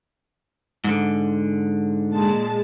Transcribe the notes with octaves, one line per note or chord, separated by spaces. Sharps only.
G#2 D3
A#2 G#3 A5